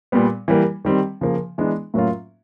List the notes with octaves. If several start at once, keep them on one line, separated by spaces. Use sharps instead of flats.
A#2 G3 B3
E3 G3 A#3
D#3 G3 C4
C#3 F3 A#3
E3 G#3 B3 D4
A2 F#3 A#3 C#4 F4